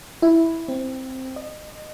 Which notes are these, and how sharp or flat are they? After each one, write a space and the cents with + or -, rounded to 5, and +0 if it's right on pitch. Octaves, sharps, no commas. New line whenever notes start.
E4 +0
C4 +0
D#5 -30